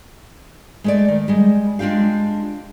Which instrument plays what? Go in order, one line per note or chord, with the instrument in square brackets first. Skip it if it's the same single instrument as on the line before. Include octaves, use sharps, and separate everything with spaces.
[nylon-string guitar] G#3 A3 D5
D#3
G3 G#3
G#3 D4 F4 G4 F5